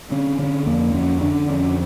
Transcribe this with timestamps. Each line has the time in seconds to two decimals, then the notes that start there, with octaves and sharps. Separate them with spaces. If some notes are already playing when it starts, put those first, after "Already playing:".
0.11 D3 C#4
0.39 D3 C#4
0.66 F2 A#3
0.94 F2 C#4
1.21 D3 D4
1.49 F2 C#4